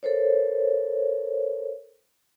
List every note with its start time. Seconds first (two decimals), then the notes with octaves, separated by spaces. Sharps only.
0.03 A4 A#4 C5 C#5